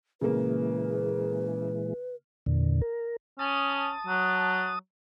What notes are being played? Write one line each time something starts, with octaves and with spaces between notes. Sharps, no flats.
A#2 C#3 E3 G#3 A#3 B4
E2 A#2 D3
A#4
C#4 A5 D#6
F#3